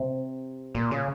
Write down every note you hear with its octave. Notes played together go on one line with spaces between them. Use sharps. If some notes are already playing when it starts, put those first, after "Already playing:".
Already playing: C3
A#2
C#3